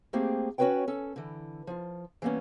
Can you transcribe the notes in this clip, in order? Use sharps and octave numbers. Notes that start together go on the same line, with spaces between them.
A3 A#3 C4 G4 G#4
C#4 F#4 G#4 B4 C#5 G5
C#4 A4
D3 E3
F3 F4
E3 G3 A#3 B3 C#4